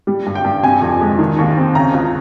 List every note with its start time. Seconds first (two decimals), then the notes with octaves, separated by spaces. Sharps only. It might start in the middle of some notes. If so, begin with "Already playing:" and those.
0.07 G3
0.26 G2
0.35 G5
0.45 G2
0.63 C3 G#5
0.82 F2
1.01 G#3
1.19 D#3
1.38 D#2
1.57 C4
1.75 C#3 A#5
1.94 C#2